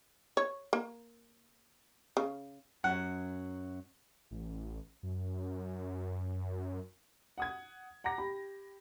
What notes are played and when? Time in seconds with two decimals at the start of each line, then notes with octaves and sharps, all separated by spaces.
0.37 C#5
0.73 A#3
2.17 C#3
2.84 F#2 F#3 F#5
4.31 A1
5.03 F#2
7.38 F#5 D#6 G#6
8.04 F#5 A#5 D6 A#6
8.18 G4 B5